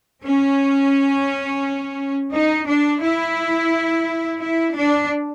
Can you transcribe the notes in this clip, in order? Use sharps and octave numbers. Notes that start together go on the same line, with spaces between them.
C#4
D#4
D4
E4
E4
D4